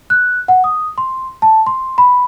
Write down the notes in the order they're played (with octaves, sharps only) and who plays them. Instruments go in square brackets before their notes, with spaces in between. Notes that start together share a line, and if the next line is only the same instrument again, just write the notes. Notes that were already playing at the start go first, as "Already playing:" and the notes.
[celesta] F#6
F#5
D#6
C6
A5
C6
B5